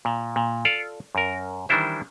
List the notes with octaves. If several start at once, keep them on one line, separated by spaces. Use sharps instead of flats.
A#2
A#2
F4 A4 D5 F5
F#2 A#4
D#3 E3 G3 D4 E4 C5